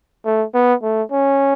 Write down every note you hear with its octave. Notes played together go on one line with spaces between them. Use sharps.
A3
B3
A3
C#4